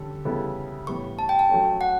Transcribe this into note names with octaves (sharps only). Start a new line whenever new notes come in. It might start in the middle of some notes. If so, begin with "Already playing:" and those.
Already playing: D3 G3 C#4 A4
C#3 G3 B3 E4 A4
A2 G3 B3 C#6
A5
G5
A5
F#3 A3 C#4
F#5